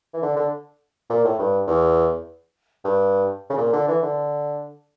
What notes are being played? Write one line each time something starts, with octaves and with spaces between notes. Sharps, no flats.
E3
D3
D3
A#2
A2
G2
E2
G2
C#3
A#2
D3
E3
D3